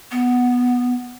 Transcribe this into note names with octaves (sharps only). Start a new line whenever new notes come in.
B3